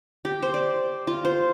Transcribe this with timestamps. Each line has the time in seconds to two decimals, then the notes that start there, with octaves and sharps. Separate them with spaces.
0.25 G4
0.42 C5
0.54 D5
1.07 F4
1.25 C5